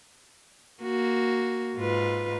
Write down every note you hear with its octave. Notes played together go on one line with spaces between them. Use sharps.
A#3 F#4
G#2 F4 B4